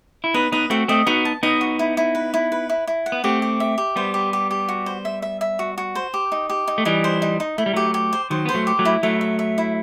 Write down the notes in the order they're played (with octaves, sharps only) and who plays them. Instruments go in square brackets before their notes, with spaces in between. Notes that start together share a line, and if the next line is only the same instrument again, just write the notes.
[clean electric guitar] E4
[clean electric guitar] B3 D#4 [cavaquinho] B4
[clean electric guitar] B3 D#4 [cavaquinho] B4
[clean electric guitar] A3 C4 [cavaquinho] F#4
[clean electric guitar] A3 C4 [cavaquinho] D#5
[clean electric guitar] B3 D#4 [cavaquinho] F#4
[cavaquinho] A5
[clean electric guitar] B3 D#4 [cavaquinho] D#5
[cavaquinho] F#4
E4
E4
B4
E4
B4
E4
E4
F#5
[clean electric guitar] B3
[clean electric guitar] A3 C4 [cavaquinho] G4
[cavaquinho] G4
E5
G4
[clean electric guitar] G3 B3 [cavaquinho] C5
[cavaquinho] G4
G4
G4
F#4
C5
E5
E5
E5
F#4
F#4
C5
G4
D#4
G4
D#4
[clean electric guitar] A3
[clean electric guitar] E3 G3 [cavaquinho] D#4
[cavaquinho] C5
D#4
D#4
[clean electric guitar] A3 [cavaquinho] E4
[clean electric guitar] G3
[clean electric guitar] F#3 A3 [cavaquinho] G4
[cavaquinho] G4
C5
[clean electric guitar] D#3 F#3 [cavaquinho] C5
[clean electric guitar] B3 [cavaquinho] C5
[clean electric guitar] F#3 A3
[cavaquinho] G4
[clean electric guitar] F#3 A3
[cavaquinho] E4
[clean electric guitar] F#3 A3 [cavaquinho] E5
[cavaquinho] E5
E5
E4